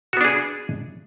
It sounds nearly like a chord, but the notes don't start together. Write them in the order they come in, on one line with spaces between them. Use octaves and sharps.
F#4 B3 D4 G#4